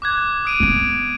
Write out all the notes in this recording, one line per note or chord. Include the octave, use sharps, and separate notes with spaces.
D6 F#6 G#6
D#6 D7 D#7
G#3 B3